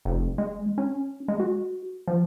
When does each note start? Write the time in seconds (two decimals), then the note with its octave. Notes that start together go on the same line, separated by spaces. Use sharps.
0.05 F1
0.38 G#3
0.78 C#4
1.28 G#3
1.40 F#4
2.07 F3